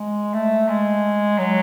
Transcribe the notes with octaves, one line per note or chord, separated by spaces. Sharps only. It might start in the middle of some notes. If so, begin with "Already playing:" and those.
Already playing: G#3
A3
G#3
F#3